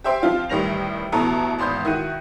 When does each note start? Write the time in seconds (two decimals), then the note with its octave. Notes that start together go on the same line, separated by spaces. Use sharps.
0.04 G4 C5 E5 G5 C6
0.22 F3 C4 F4 C7
0.50 A1 A2 D#3 G3 A#6 F7
1.12 A1 B2 B3 E4 A4 A#5
1.58 G#1 E2 B5 C6 D#6 G6
1.85 D#3 E4 F#4 D#7